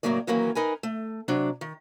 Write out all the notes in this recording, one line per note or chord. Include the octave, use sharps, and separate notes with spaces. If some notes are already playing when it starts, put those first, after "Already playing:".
A2 C#3 F3 F#3 A#3 D5
D#3 E3 F#3 A#3 C#4
D#4 A#4 B4 G#5
A3
C3 F#3 D4
D#3